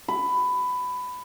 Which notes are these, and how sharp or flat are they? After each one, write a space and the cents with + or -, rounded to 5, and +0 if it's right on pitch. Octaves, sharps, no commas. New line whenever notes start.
B5 +15